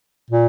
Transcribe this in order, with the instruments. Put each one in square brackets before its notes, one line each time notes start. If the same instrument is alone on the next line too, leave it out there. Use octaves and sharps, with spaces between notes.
[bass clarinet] A#2